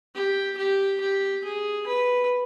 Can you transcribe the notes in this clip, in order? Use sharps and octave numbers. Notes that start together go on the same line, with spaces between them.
G4
G4
G4
G#4
B4